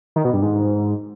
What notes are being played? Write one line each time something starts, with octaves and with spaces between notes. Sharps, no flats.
D#3
B2
G2
G#2